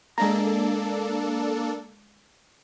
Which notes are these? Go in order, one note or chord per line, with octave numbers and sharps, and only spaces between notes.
G#3 A#3 D4 A4 A#5